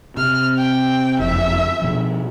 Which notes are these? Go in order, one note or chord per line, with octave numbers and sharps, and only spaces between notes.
C3 F6
G5
F#1 F2 E5
B2 F3